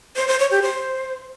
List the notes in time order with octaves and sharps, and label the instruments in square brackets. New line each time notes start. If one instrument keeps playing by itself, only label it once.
[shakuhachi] C5
C5
C#5
G4
C5